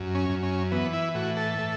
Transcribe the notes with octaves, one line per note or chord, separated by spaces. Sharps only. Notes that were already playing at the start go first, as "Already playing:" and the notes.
Already playing: F#2
C#4
F#2
C#4
E3 B3
E4
A2 F#4
A4
A2